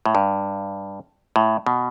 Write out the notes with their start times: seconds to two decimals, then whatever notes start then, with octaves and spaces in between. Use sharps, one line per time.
0.06 A2
0.15 G2
1.36 A2
1.66 B2